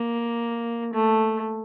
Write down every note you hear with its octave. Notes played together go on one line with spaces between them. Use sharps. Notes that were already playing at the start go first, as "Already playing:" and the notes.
Already playing: A#3
A3